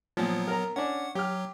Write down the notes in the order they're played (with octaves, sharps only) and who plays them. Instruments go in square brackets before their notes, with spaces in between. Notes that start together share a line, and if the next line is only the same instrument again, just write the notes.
[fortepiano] A#2 F3 [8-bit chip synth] F#3 B3
[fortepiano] A#4 A#5
[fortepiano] C#4 D4 [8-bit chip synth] F#5
[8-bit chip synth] F#3 [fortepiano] G4 F6